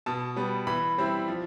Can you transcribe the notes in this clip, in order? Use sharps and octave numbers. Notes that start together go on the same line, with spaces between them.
B2 A5
G3 B3
E3 B5
G3 C4 E4
F3